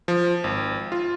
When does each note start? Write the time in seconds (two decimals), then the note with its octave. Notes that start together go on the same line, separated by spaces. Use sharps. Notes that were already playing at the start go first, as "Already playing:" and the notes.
0.08 F3
0.44 G#1
0.92 F4